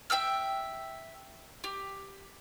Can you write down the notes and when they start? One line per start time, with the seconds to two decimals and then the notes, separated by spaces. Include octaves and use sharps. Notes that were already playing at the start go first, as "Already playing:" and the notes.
0.10 E5 G5 E6 F6
1.64 G4